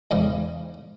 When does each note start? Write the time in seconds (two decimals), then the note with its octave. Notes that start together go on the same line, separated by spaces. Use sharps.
0.11 E2 G#2 C#3